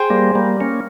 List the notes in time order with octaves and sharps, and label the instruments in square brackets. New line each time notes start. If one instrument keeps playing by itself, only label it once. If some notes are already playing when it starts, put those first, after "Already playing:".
Already playing: [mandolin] G#4 C5 G5
[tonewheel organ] G3 A#3
G3 A#3
A#3 C#4